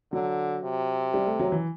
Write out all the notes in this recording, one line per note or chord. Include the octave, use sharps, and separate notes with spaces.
D3 F#3
C3
G3
A3
F#3
E3